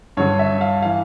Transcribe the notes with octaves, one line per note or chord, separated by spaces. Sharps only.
G2 D3 C#5
E5
F5
E3 F5